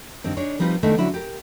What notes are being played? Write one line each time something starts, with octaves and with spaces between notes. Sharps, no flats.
G2 D#3 C4
D4 D#4 G#4 C#5
F3 G3 C4 D#4 F4 B4
D#3 A3 B3 D4 E4
D3 F#3 G3 C#4 E4
G4 A#4